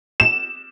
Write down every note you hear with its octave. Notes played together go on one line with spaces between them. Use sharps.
E7